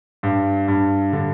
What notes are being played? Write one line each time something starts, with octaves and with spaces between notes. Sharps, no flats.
G2
G2
D3